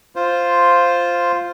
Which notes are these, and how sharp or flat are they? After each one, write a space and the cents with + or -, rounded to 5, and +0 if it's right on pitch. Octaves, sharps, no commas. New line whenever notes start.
F4 +0 C5 +0